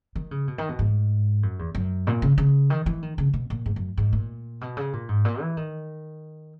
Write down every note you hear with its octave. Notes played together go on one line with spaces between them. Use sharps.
D#3
C#3
B2
D#3
B2
G#2
F#2
E2
F#2
A#2
C#3
C#3
D#3
E3
D#3
C#3
B2
A#2
G#2
F#2
G#2
A#2
B2
C#3
A#2
G#2
A#2
E3
D#3